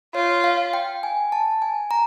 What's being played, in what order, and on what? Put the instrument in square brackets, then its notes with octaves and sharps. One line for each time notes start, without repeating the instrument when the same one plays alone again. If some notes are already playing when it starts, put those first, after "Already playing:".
[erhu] F4 [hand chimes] C#5
[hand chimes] F5
G5
G#5
A5
G#5
A#5